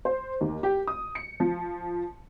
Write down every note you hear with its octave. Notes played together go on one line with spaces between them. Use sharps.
C5
D#2
G4
D#6
C#7
F3